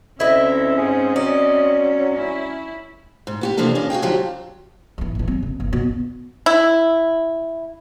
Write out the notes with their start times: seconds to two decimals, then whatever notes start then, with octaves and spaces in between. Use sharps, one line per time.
0.20 D2 C4 C#4 E4 D#5 E5
0.77 G#2 G#4
1.16 F#3 D5 D#5
2.15 C#4 E4
3.27 G#2
3.41 B3 F#4 G4
3.57 C3 E3 F3 A#3 D4 A4
3.75 C#4 D4 D#5 F5
3.90 F#4 G#4 F5 G5
4.02 D3 F3 F#3 A3 G4 G5
4.98 G#2 E3
5.15 A#1 E2
5.28 G3 C4
5.43 C#3
5.60 G1
5.73 B2
6.46 E4